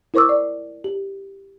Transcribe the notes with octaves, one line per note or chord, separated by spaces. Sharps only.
E4 A#4 C5 C#6 D6 E6
D5
G4